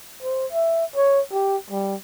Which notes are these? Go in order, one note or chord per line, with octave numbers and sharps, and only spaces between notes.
C5
E5
C#5
G4
G3